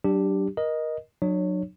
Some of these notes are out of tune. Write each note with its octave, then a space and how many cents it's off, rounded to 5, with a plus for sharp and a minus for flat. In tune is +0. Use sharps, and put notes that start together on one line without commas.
F#3 +45 D4 +5 G4 +0
A#4 +25 D#5 +0
F#3 -15 D4 +45 C#5 +0